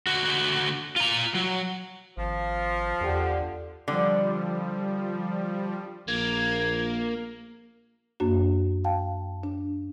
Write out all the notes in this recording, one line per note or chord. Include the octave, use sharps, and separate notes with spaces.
D3 F#4
F4 A#5
F#3
G#1 F3
E2 D3 G4
D3 F3 G3
A#1 A#3 G#6
F#2 A#3 D4 F#4
F5 G5 A5
D4